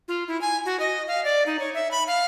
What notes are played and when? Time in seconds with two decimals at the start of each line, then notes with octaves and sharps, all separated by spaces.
0.08 F4
0.28 E4
0.41 G#5
0.65 F#4
0.80 D#5
1.08 F5
1.24 D5
1.46 D#4
1.60 C#5
1.74 E5
1.91 B5
2.07 F5